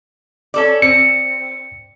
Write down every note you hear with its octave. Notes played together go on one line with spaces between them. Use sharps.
C#4 A4 D5
C4 C#7